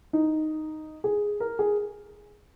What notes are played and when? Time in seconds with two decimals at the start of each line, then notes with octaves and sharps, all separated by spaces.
0.13 D#4
1.04 G#4
1.40 A#4
1.59 G#4